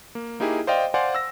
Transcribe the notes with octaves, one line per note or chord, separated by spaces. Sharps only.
A#3
A#3 D#4 E4 G4 G#4
C5 D5 D#5 F5 G5
C5 D5 F5 F#5 G#5 C6
E6 A#6